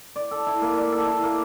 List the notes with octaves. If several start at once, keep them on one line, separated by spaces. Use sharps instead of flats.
D5
A4
E4
A#3
D5
A4
E4
A#3